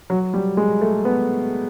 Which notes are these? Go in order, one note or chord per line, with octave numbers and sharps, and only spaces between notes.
F#3
G3
G#3
A3
B3